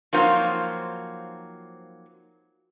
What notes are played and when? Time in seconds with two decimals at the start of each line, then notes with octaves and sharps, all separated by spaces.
0.13 F3 F#3 A#3 C4 D#4 F4